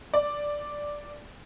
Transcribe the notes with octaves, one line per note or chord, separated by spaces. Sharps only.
D5